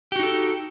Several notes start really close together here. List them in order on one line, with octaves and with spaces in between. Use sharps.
G4 F#4 D#4 A4